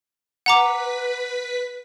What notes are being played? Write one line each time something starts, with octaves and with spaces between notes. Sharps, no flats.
B4 F#5 A#5 B5 D6